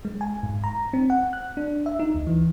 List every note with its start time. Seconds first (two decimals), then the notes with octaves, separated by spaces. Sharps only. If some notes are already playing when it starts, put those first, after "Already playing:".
0.05 G#3
0.21 G#5
0.43 G#2
0.64 A#5
0.93 C4
1.10 F#5
1.33 F#6
1.57 D4
1.86 E5
1.99 D#4
2.15 D2
2.27 E3